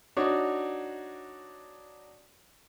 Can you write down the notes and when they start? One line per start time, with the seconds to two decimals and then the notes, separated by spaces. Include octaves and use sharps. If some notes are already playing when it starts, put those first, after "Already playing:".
0.17 D4 D#4 F#4 C#5